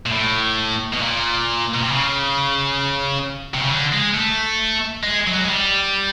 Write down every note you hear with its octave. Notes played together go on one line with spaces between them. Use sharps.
A#2
A2
B2
A#2
B2
C3
C#3
C3
C#3
D3
G#3
A3
G#3
F#3
G#3
G3